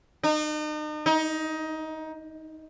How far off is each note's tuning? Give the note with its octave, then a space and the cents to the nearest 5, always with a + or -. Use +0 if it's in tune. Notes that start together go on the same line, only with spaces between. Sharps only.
D#4 -40
D#4 +20